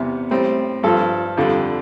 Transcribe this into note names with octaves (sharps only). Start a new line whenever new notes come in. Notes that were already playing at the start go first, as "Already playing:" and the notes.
Already playing: E2 C3 G3 B3
A2 G3 C4
G2 F3 A4
F2 D3 G3